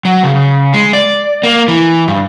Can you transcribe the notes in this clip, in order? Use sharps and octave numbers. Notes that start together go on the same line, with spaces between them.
F#3
C#3
G#3
D5
A#3
E3
G2